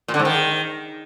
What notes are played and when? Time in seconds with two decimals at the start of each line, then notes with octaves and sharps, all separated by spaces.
0.08 A#2
0.14 D3
0.19 G#2
0.25 D#3